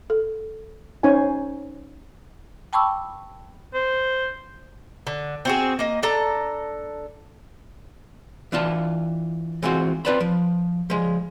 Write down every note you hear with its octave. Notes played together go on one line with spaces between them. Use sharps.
A4
C#4 D#4 C5 C#5 G#5
G5 A5 B5 C#6 D6 E6
C5
D3
C4 F#4 G#4
A#3 D#5
D4 A4 A#5
E3 D4 F4 A5
E3 G#3 C4 F4 F#4
C4 F4 B4 D5 A5 B5
F3
F3 G#3